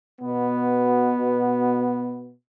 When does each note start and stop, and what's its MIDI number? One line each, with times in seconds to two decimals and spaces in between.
0.21 2.33 47
0.21 2.33 59